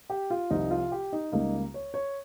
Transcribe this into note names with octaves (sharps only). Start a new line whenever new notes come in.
G4
F4
C2 C3 F3 D#4
F4
G4
D#4
C#2 C#3 G3 A#3 D#4
C#5
C#5